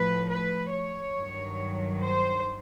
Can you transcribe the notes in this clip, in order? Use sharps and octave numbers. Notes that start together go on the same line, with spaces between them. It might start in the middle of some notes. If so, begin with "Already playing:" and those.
Already playing: A2 F3 B4
B4
C#5
G2 D#3 F#3
C5